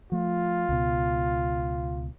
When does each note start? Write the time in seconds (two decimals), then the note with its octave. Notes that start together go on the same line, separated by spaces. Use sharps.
0.12 F3 A3 F4
0.69 C#2 B2